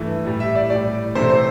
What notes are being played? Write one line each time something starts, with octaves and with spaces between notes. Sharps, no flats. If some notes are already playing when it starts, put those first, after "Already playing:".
Already playing: G2 E3 A3
A2 G3
E5
D5
A2 G3 D5
C3 E3 A3 C5
C5